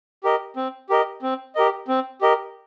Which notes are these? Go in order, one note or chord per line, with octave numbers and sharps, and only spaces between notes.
G4 A#4 D#5
C4
G4 A#4 D#5
C4
G4 A#4 D#5
C4
G4 A#4 D#5